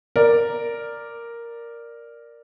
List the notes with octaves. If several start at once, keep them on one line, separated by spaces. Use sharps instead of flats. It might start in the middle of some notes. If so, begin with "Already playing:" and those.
A#4 D5